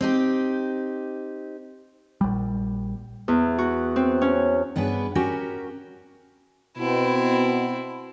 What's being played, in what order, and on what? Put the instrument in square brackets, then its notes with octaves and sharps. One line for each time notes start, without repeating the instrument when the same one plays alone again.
[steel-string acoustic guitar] C4 D#4 G4
[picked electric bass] A#1 G3
[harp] E2
F#4
C4
C#4
[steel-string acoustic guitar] G2 B3 D4 G#4 B4
C#4 F#4 G4 A#4
[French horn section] B2 [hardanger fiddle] C4 E4